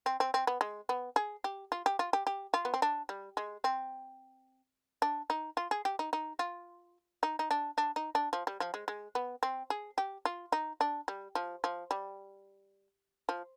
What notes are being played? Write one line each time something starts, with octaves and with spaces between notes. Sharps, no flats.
C4
C4
C4
B3
G#3
B3
G#4
G4
F4
G4
F4
G4
G4
F4
B3
C4
D4
G3
G#3
C4
D4
D#4
F4
G#4
G4
D#4
D#4
F4
D#4
D#4
D4
D4
D#4
D4
F3
G3
F3
G#3
G#3
B3
C4
G#4
G4
F4
D#4
D4
G3
F3
F3
G3
F3